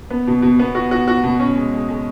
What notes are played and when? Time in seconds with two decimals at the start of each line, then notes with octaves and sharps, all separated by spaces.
0.10 B3
0.27 B2
0.42 B2
0.59 B3
0.75 F#4
0.91 F#4
1.08 F#4
1.24 B2
1.39 C#4
1.56 G#3
1.73 G#3
1.89 G#3